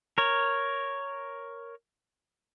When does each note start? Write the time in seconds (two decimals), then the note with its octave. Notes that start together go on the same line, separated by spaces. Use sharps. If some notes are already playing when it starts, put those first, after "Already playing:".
0.18 A#4 C#5